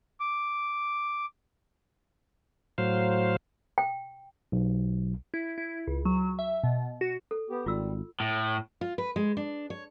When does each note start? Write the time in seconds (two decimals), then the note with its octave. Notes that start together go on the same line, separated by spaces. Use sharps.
0.20 D6
2.78 A2 F#3 C5 F5
3.78 G5
4.52 B1
5.34 E4
5.58 E4
5.87 C#2
6.05 F#3
6.39 E5
6.64 B2
7.01 F#4
7.31 A4
7.50 B3 G4
7.66 G#1 G3 F4 F#4 E6
8.20 A2
8.81 F4
8.98 B4
9.16 G#3
9.37 D4
9.70 C#5